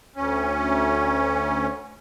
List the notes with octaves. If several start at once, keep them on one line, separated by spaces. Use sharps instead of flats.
D2 C#4